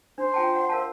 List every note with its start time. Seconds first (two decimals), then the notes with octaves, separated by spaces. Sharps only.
0.18 D4 C5
0.34 F4 G5 A5
0.55 F#5
0.69 A#4 F5 A5